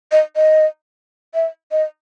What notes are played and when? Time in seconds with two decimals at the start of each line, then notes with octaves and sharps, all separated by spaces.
0.12 D#5
0.36 D#5
1.34 E5
1.72 D#5